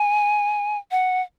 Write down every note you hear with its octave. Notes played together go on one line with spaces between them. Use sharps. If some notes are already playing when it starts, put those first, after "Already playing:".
Already playing: G#5
F#5